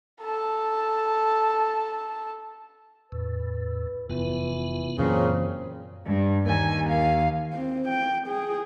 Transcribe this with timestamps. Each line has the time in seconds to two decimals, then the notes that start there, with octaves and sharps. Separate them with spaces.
0.22 A4 A5
3.12 E2 A2 B4
4.10 F1 E3 B3 F4
4.98 F#2 A#2 C#3 E3 F#3 C4
6.06 G2
6.47 D#2 G#5
6.89 F5
7.53 C4
7.88 G5
8.27 G#4